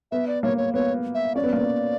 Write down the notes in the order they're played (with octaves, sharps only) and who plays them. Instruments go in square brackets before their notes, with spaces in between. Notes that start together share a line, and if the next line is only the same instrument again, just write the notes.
[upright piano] B3 [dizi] E5
[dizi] D5
[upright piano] A#3 [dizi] C#5
[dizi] C#5
[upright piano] B3 [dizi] C#5
[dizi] E5
[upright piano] C#4 [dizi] D5
[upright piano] B3
A#3
B3